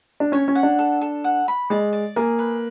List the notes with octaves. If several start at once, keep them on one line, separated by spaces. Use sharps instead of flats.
D4
C#4 C#5
C#4
F#5
D4
A4
A4
F#5
B5
G#3 D5
D5
A#3 G#4
B4